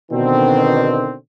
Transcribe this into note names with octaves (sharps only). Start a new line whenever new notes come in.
B2 D3 D#3 C4